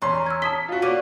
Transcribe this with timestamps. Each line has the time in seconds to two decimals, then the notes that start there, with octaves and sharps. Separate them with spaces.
0.02 E2 C#4 C6
0.15 A#5
0.26 E6 F6 G#6
0.42 A5 D#6 B6 G7
0.68 F4 F#4
0.82 A#3 C#4 D4 D6 B6 D#7